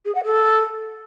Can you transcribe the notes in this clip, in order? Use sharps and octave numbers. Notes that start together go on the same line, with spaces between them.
G#4
F#5
A4